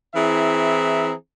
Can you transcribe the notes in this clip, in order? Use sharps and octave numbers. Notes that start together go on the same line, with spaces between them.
E3 C4 E4 G#4 E5 A#5